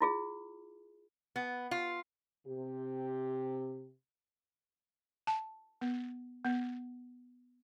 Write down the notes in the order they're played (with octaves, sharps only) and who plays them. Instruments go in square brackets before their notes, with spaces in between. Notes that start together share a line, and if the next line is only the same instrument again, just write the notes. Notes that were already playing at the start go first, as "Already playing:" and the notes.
[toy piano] E4 F4 G#4
[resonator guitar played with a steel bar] B3
F4
[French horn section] C3 G4
[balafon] A5
B3
B3